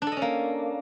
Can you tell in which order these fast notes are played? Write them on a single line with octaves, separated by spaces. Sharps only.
D4 A4 D#5 C#4 A#3